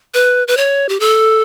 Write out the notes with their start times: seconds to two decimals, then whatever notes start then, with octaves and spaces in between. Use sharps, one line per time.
0.14 B4
0.48 B4
0.57 C#5
0.89 G4
1.00 A4